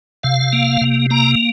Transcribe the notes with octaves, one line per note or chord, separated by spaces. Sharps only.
C3 F5
A#3
C3
A#3 A#5